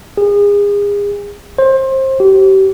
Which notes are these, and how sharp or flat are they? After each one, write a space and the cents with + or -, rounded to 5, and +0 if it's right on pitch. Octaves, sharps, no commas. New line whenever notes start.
G#4 -35
C5 +25
G4 -35